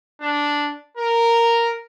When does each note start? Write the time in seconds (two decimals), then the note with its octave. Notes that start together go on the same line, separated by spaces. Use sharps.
0.21 D4
0.97 A#4